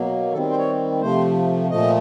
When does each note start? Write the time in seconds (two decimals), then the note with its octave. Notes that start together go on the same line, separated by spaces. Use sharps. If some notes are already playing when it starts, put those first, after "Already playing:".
Already playing: B2 F#3 A#3
0.32 D#3 G3 C4 A4
0.50 C5
0.58 C#5
1.02 C3 F3 A3 C5
1.70 A#2 F3 A3 D#5